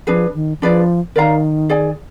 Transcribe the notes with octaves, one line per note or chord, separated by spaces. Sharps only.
F3 D4 G#4 B4
D#3
F3 D4 G#4 B4 D5
D#3 A#4 D5 F5 A#5
G#4 D5 G#5